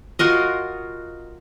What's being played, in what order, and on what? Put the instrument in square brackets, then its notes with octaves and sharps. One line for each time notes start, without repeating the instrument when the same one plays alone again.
[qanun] F4 F#4 A#4 D#5